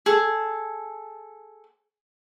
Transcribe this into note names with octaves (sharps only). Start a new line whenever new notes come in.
G#4 A4